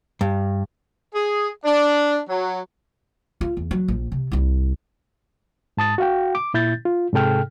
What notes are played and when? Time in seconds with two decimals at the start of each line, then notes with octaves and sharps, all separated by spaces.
0.21 G2
1.15 G#4
1.65 D4
2.30 F#3
3.41 F4
3.57 E2
3.71 F#3
3.88 A#1
4.12 C3
4.32 C2 E4
5.77 G#2 A5 D#6 A6
5.98 F#4 F5 G5
6.35 D6
6.54 A#2 E4 G6 A6
6.85 F4
7.13 G#2 C3 G#4 A4 G5 F6